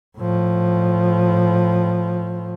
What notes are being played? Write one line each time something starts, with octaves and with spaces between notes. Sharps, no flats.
A2 F3